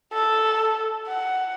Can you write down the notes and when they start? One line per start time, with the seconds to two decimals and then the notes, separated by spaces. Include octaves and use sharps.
0.13 A4
1.08 F#5